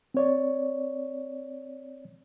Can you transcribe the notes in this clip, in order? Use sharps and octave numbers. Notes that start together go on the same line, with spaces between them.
C4 C#5 D5